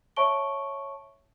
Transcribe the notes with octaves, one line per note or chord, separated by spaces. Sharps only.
C#5 E5 A5 C#6 D7 G7